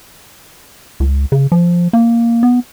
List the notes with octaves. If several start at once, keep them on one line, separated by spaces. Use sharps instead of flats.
C#2
C#3
F3
A#3
B3